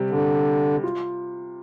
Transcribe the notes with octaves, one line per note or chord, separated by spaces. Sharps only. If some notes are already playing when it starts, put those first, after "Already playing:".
Already playing: C3 G3
D3
F4